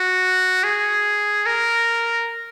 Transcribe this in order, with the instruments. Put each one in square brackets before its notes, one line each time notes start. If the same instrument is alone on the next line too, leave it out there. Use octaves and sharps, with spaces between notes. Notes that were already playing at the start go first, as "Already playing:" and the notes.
Already playing: [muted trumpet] F#4
G#4
A#4